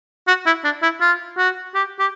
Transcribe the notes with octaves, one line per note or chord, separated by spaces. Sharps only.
F#4
E4
D4
E4
F4
F#4
G4
G4